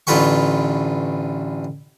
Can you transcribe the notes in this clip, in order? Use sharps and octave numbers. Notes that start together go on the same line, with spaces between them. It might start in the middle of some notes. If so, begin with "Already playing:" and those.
A1 D3 F4 B4 G5 C#6